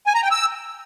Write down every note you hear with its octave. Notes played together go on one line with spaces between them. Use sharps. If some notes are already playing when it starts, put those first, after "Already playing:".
G#5
A#5
G5
E6